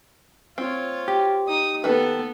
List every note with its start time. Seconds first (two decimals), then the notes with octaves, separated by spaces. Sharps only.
0.58 C4 F4 C#5
1.08 G4
1.47 D#4 D#6
1.84 D#3 B3 A4 B4